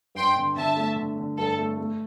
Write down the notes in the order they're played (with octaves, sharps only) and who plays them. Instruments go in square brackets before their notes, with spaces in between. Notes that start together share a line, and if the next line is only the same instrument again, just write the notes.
[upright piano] G2 [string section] G5 C6
[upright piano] D3
[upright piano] D3 [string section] E5 A5
[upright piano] A3
D3
D3
[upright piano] G2 [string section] A4
[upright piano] A3
A3